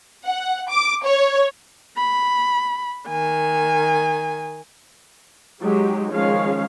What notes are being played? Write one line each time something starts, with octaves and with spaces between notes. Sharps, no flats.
F#5
D6
C#5
B5
D#3 G#5
F#3 G#3 D#4 G4
D#3 F3 G#3 C#4 C#5 F5